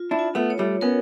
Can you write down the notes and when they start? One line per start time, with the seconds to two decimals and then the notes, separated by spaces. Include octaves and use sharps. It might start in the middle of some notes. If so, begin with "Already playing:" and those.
Already playing: F4
0.11 D4 E4
0.19 F4
0.35 A3 B3
0.50 C#5
0.59 G3 A3
0.81 B3 C#4 A#4